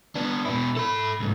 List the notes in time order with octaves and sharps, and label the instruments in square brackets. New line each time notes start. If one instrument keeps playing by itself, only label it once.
[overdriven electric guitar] B3 D4
B2 E4
A4 B5
C2 G#2